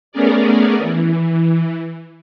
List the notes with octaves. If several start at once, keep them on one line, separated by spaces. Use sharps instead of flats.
A3 B3 C#4 G#4 A#4 D5
E3